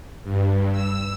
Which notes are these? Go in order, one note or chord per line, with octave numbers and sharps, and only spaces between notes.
G2
E6